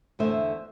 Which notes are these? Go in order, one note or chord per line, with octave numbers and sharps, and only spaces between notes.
E2 D3 A3 C5 E5